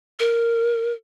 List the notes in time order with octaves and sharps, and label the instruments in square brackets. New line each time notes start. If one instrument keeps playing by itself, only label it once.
[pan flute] A#4